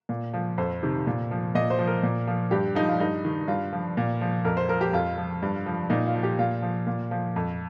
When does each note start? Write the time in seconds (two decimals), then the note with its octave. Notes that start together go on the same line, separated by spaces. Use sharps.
0.09 A#2
0.34 F3
0.58 F2 C5
0.83 C3 D#3
1.07 A#2
1.31 F3
1.55 A#2 D#5
1.70 C5
1.79 F3
1.87 A#4
2.03 A#2
2.27 F3
2.51 G2 G4
2.75 F3 D#4
2.88 F4
3.00 G2 D#4
3.25 D#3
3.48 G2 F4
3.73 F3
3.97 A#2
4.21 F3
4.45 F2 A#4
4.57 C5
4.69 F3 A#4
4.81 G4
4.93 F2 F4
5.18 F3
5.42 G2
5.66 F3
5.90 A#2 D#4
6.07 F4
6.15 F3
6.23 G4
6.39 A#2 F4
6.62 F3
6.87 A#2
7.11 F3
7.36 F2